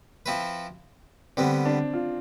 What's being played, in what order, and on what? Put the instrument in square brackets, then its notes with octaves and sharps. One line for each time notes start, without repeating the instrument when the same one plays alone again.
[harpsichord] F3 C4 E4 B4
[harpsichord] D3 G3 B3 [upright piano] C4
[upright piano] D4
F4